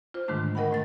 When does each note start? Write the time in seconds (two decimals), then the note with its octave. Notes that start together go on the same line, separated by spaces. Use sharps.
0.14 F4 C5
0.28 G#2 D3 D#3 G#3 A3 D4
0.55 A#4 D#5 F#5 G5 B5
0.71 A2 A3 A6